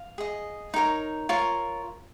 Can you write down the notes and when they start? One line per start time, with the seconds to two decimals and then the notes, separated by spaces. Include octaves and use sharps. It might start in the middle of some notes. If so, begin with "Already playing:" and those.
Already playing: F5
0.18 G#4 D#5
0.74 D#4 A#4 C#5
1.29 F4 A#4 C#5